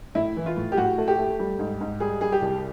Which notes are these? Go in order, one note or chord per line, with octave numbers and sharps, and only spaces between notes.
A2 E4
E3
F4
A2
G4
A2 F#4
A3
G4
A3
G3
G#2
G#2
G3 G#4
G3 G#4
G4
C2